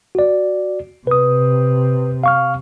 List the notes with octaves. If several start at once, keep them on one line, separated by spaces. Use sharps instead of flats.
F#4 D5
C3 B4 D#6
F5 C#6 F6